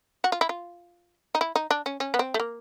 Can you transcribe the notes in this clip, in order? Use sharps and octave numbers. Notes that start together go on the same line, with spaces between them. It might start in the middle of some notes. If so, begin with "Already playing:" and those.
F#4
F4
E4
F4
D#4
E4
D#4
D4
C#4
C#4
B3
C4
A3
A#3